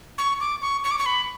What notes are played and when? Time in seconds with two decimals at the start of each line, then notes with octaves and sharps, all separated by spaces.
0.18 C#6
0.40 D6
0.62 C#6
0.84 C#6
0.91 D6
0.99 C#6
1.06 B5